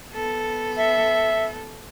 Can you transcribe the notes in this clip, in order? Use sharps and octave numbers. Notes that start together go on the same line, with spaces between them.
B3 A4
E5